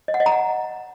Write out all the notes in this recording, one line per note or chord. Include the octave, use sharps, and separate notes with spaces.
D#5
F#5
D#5
A#5
F#5